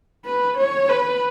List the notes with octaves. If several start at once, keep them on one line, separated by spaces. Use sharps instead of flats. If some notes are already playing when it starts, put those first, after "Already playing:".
B4
C#5
B4